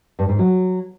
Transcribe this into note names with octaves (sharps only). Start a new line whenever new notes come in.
G2
G#2
F#3